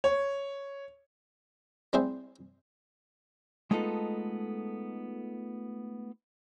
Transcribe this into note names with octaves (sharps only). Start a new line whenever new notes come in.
C#5
G3 C4 E4 G#4 C5
G#3 A3 B3 D#4 F4 A4